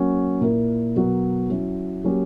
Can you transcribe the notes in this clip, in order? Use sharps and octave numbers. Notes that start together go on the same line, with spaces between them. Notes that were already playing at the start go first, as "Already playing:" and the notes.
Already playing: F#3 A#3 C#4 F#4
A#2 A#3 E4 A#4
B2 F#3 B3 F#4 A#4
F#3 C#4 E4
F#3 A#3 C#4 G4